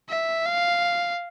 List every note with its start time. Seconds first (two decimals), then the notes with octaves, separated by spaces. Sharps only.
0.09 E5
0.46 F5